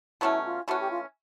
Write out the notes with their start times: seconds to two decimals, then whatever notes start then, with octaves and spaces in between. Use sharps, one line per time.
0.21 B2 F#3 A3 C#4 E4
0.45 F4
0.67 E3 A3 C#4 F#4
0.80 G4
0.91 F4